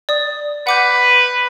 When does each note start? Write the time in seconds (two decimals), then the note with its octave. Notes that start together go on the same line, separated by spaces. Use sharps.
0.09 D5 D#6
0.67 B4 F#5 D6 G6